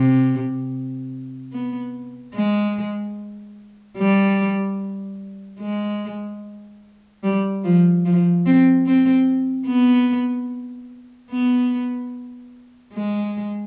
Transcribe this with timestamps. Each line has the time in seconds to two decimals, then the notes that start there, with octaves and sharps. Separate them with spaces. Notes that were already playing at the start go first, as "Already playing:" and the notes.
Already playing: C3
1.53 B3
2.34 G#3
3.98 G3
5.60 G#3
7.23 G3
7.64 F3
8.05 F3
8.46 C4
8.86 C4
9.67 B3
11.31 B3
12.94 G#3